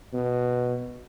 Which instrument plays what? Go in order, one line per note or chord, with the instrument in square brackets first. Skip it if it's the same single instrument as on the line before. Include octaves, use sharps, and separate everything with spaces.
[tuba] B2